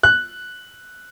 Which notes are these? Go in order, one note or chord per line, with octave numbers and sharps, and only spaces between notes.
F#6